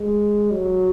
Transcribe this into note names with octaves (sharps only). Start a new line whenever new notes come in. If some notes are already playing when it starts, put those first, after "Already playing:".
Already playing: G#3
F#3